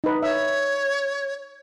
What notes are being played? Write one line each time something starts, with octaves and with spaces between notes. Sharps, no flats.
D#4 B4
C#5 E5